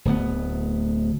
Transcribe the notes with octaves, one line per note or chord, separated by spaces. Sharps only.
D1 D2 B3